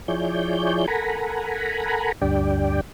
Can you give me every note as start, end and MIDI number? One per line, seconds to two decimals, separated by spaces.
0.08 0.86 53
0.08 0.86 64
0.08 0.86 68
0.08 0.86 73
0.08 0.86 74
0.08 0.86 91
0.88 2.12 69
0.88 2.12 70
0.88 2.12 78
0.88 2.12 80
0.88 2.12 82
0.88 2.12 83
2.22 2.81 38
2.22 2.81 43
2.22 2.81 62
2.22 2.81 67
2.22 2.81 74
2.22 2.81 79